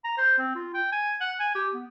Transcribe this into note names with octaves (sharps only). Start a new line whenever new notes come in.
A#5
C5
C4
F4
G5
G#5
F#5
G#5
G4
B3